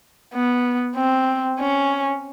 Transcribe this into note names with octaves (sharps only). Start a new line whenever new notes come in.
B3
C4
C#4